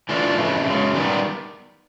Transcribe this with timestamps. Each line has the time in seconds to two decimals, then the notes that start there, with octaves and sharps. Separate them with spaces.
0.09 E3 A3 D4 F4
0.37 F2 C#3 E3 A3
0.65 F#2 C#3 G#3
0.94 D#3 G3 B3